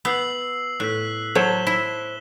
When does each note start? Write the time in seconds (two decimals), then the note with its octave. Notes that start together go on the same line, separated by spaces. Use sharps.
0.05 B3 E6 C7 F#7
0.80 A2 F#6 B6
1.35 F#3 C5 C#5 A5 E7 G7
1.67 E4